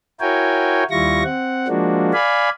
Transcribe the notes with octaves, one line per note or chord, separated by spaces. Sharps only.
E4 F#4 A#4 C#5 G5 G#5
D#2 G3 E4 F4 C#6 A#6
C4 F#5
F3 G#3 A#3 D4 F#4
D5 F5 G#5 B5